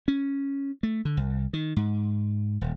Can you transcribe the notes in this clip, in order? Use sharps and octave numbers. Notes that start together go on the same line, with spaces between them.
C#4
A3
D3
C2
D#3
G#2
D#1